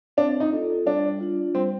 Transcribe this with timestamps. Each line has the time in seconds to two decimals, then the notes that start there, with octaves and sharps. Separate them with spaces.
0.17 C4 D4
0.40 D#4
0.52 F4 A4
0.86 G3 D4
1.20 D4 F4
1.55 G3 C4